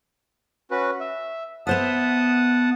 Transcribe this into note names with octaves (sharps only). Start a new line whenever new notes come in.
C#4 F#4 B4
E5
B3 C5 E5 F#5 A5 D#6